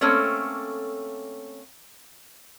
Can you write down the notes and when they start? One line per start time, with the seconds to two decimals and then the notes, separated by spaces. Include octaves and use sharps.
0.01 A3 A#3 C4 C#4 A4